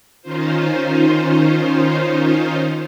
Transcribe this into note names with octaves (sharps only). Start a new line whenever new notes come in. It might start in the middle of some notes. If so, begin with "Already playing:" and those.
D#3 C#4 D#4 F4 C5